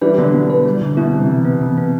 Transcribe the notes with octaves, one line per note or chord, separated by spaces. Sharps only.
E3 G3 B4
D3 F#3 B3
B2 B3
B4
G3
D3
B2 E4
C3 G3
E3
B3
E3
B3